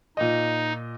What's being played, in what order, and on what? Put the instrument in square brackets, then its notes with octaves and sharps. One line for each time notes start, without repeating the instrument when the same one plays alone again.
[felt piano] A#2 D#5 [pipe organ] D#4